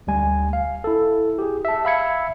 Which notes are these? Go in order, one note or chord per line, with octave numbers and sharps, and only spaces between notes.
D2 G3 G#5
F5
E4 A4
G4 G#4
E5 A5
E5 F5 B5 E6 G#6 C#7